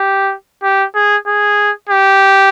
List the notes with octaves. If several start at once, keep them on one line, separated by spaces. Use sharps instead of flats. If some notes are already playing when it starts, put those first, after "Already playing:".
Already playing: G4
G4
G#4
G#4
G4